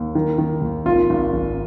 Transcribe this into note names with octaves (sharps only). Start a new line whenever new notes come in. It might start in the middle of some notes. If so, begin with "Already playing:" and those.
Already playing: D#2
D#3
D#3
D#2
G#1 F4
G#1
G#1